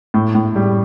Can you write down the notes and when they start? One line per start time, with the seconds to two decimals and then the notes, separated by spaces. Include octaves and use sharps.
0.14 A2
0.35 A2
0.56 G3